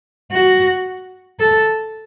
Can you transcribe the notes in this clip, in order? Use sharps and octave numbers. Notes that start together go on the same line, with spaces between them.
F#4
A4